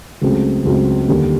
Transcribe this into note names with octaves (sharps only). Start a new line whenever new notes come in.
C#2 C#3 F#3 A3 C4
C#2 C#3 F#3 A3 C4
D#2 D3 G3